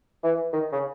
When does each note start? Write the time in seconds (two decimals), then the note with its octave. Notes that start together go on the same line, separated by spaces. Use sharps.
0.23 E3
0.53 D#3
0.72 C#3